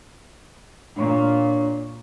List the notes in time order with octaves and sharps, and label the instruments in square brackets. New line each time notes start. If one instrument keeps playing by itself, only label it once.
[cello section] A#2 [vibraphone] D4 C#5 C#6